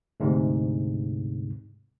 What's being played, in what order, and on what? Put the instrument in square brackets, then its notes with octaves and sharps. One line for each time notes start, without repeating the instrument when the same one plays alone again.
[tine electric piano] D2 G#2 C3